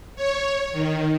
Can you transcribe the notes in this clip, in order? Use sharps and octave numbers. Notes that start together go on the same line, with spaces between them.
C#5
D#3